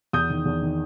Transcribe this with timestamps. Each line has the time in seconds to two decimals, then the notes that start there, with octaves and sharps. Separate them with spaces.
0.13 E2 D#6 G6
0.30 D#3
0.45 E2
0.62 D#3